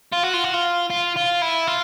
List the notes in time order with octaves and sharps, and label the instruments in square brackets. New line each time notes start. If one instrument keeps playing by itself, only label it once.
[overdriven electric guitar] F4
F#4
F4
F#4
F4
F4
F4
E4
F4